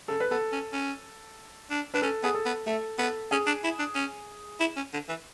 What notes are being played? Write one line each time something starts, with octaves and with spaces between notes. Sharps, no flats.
C#3 A4
B4
B3 A4
C#4
C#4
D4
D4 B4
C#4 A4
B3 G#4
A4
B3
A3 A4
B3 A4
C#4 G#4
D4
E4
D4
C#4
E4
C#4
D3
E3